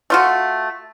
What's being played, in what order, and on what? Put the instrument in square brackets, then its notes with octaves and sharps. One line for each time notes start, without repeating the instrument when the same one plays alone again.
[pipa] A3 F4 F#4